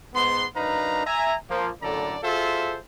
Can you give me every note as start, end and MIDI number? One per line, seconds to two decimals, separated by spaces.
0.14 0.45 44
0.14 0.45 59
0.14 0.45 84
0.55 1.05 42
0.55 1.05 62
0.55 1.05 63
0.55 1.05 71
0.55 1.05 77
0.55 1.05 82
1.06 1.35 76
1.06 1.35 80
1.06 1.35 82
1.50 1.69 53
1.50 1.69 58
1.82 2.17 42
1.82 2.17 45
1.82 2.17 50
1.82 2.17 69
1.82 2.17 74
1.82 2.17 82
2.23 2.78 65
2.23 2.78 66
2.23 2.78 68
2.23 2.78 69
2.23 2.78 72
2.23 2.78 76